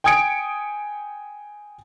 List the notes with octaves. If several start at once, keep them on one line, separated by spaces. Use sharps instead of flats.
G5 G#5 D#6 G#6 C#7 D7